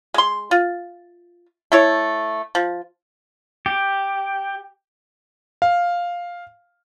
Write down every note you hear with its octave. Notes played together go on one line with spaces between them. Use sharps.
G#3 C6
F4
A3 E4 C#5
F3
G4
F5